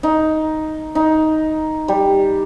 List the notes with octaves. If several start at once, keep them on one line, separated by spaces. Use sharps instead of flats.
D#4
D#4
G3